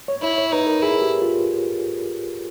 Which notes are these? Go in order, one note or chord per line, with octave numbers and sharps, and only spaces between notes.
C#5
E4 C#5
C#5
D#4 B4
A#4
E4 G#4
G4
F4